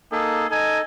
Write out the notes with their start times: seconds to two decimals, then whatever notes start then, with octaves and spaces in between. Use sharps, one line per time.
0.12 A#3 D#4 G#4 A4
0.51 D#4 A4 D#5 G#5